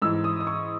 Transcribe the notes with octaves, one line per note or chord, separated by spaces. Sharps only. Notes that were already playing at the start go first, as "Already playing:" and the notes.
G#2 E3 E6
D#6
D#6
C#6